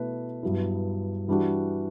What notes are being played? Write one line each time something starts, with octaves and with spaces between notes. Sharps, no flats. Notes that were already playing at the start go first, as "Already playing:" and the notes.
Already playing: B2 A3 E4 B4
G2 F#3 B3 E4
E3 G3 D4 F#4